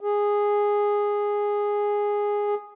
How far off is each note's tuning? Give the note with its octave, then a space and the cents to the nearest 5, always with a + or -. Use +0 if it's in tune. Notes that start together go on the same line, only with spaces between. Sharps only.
G#4 -10